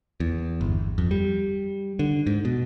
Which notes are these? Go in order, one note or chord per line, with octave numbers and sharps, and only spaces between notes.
E2
G1
F2
G3
D3
G#2
B2